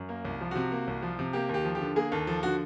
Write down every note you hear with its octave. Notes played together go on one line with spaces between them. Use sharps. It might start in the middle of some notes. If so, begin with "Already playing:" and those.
Already playing: F#2
A#3
C2
F3
C3 F#4
A#3
C2
F3
C3
A#3 G4
D#2 G4
F3
G4
D3
A#3 G#4
D#2 A4
F3 A4
D3 F#4